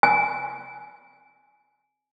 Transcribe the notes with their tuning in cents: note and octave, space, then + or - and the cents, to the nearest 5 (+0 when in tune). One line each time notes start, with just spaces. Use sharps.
G#5 +20